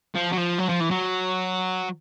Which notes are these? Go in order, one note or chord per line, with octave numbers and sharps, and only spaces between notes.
F3
F#3
F3
F#3
F3
E3
F#3